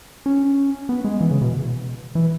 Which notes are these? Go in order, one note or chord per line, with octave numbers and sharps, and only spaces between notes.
C#4
B3
G#3
E3
C#3
B2
E3